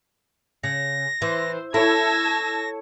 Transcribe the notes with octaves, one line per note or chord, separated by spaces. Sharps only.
C#3 A#6
E3 C5
E4 A4 C#5 A5 E6 G#6 A#6